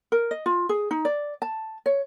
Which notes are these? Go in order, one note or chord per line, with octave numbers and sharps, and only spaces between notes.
A#4
D#5
F4
G#4
D#4
D5
A5
C#5